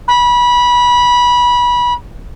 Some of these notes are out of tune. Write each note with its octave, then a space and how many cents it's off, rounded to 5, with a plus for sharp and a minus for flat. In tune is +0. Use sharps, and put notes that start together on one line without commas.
B5 -20